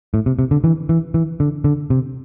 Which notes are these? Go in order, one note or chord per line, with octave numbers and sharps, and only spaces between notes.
A2
C3
C3
D3
E3
E3
E3
D3
D3
C3